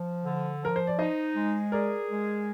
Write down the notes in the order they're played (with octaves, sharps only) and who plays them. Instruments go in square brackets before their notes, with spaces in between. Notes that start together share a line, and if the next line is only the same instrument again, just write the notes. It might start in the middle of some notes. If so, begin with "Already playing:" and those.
Already playing: [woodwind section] F3
D3
[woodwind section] F3 [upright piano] A#4
[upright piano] C5
D5
[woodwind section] D#4 [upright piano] C5 D#5
[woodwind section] G#3
[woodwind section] G#4 [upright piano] A#4 D5
[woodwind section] G#3